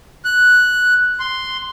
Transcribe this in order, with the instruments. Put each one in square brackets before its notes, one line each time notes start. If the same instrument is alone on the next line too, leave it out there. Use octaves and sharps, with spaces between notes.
[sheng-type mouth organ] F#6
C6